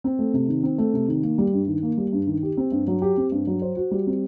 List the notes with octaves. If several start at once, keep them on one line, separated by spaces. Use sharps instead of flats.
C4
A3
C3
D#3
C4
A3
C3
D#3
A#3
G3
G2
D#3
A#3
G3
G2
D#3
G4
C4
G2
F#3
G4
C4
G2
F#3
C5
F#4
G3
C4